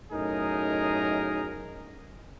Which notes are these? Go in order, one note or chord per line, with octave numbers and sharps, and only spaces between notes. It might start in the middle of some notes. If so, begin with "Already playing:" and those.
F#2 A2 D#4 G#4 A#4